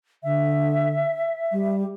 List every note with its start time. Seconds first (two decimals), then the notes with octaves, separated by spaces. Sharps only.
0.24 D3 E5
1.52 G3